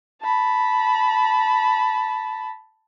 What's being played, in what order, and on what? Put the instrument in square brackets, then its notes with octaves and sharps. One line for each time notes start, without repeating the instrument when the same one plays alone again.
[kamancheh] A5 B5